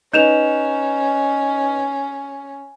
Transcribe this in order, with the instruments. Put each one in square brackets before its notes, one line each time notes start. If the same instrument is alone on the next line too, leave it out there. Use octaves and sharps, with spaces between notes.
[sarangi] C#4 [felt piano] D#4 B4 [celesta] G6 E7 F7